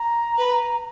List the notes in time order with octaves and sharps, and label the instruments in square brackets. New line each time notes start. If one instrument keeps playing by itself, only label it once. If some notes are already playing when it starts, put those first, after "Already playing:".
Already playing: [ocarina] A#5
[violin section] B4